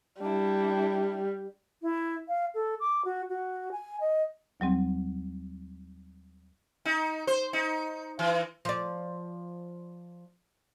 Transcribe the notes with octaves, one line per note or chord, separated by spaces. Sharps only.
G3 D4 E4
E4
F5
A4
D6
F#4
F#4
G#5
D#5
D#2 F#3 G3 C4
D#4
C5
D#4
E3
F3 D5